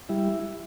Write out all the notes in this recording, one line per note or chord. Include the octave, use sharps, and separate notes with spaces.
G3 E4